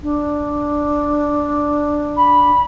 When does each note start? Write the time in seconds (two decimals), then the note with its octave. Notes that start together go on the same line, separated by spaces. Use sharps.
0.03 D4
2.17 B5